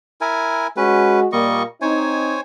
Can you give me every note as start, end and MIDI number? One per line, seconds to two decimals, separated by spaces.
0.21 0.67 64
0.21 0.67 70
0.21 0.67 80
0.77 1.26 56
0.77 1.20 61
0.77 1.26 66
0.77 1.20 71
1.32 1.63 46
1.32 1.63 55
1.32 1.63 58
1.32 1.63 75
1.32 1.63 85
1.82 2.37 60
1.82 2.37 63
1.82 2.41 72
1.82 2.41 73
1.82 2.41 80